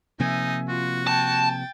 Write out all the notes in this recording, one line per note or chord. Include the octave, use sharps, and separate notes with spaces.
C3 F3 A#3 D#4 E5 G#5
F4 F#4
G5 A5 A6